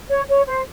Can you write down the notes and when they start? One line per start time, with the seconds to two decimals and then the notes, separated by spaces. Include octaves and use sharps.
0.09 C#5
0.29 C#5
0.47 C5